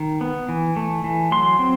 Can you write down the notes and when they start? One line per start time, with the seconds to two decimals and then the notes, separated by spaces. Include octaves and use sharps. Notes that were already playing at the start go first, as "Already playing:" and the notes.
Already playing: D#3
0.21 B3
0.49 E3
0.76 A3
1.04 E3
1.32 F#3 C6
1.59 C4